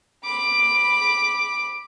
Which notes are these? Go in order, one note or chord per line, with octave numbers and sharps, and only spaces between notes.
B5 D6